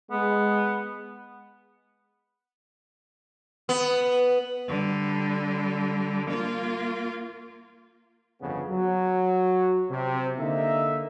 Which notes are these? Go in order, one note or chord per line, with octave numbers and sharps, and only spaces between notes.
G#3 B3
B3
D3 G3
A#3 F4
G1 F2 C#3 B3
F#3
C3
D3 A#3 D#4 E5